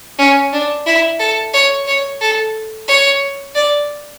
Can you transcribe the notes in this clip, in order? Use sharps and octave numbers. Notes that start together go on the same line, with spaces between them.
C#4
D4
E4
A4
C#5
C#5
A4
C#5
D5